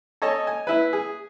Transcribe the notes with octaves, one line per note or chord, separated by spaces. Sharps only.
A4 C#5 D#5 G#5 A5
G#5
E4 B4
G#4